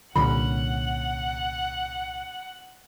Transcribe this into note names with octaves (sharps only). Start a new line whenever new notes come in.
C2 A#2 D3 C#4 F#5 B5